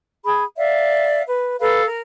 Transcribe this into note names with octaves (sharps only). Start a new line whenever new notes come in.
G#4 B5
D5 E5 F5
B4
A4 B4 F5
A#4